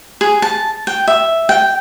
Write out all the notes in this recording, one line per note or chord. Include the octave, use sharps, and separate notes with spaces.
G#4
A5
G5
E5
G5